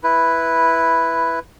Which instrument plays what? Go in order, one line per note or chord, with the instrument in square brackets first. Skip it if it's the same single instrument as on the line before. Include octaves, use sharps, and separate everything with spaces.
[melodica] E4 B4